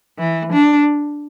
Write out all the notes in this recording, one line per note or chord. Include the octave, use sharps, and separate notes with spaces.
E3
D4